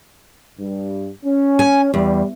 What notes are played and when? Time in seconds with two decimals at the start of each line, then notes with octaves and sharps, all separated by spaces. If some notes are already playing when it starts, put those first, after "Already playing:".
0.59 G2
1.23 C#4
1.59 G#5
1.94 E2 G3